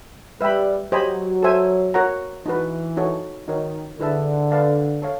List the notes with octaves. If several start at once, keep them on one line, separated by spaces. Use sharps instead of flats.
G3 B4 E5 G5 B5
F#3 G4 C5 D#5 G#5 B5
A4 C5 E5 G#5
F#4 A#4 C#5 F#5 A#5
E3 D#4 F#4 B4
D#4 F#4 A4 C#5
D#3 D#4 F#4 A#4 C#5
D3 E4 G#4 B4 E5 A5
B4 D5 F5 A5
A4 C#5 F5